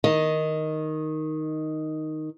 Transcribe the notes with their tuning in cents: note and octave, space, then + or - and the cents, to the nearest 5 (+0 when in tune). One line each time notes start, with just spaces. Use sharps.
D#3 +0 D#5 +5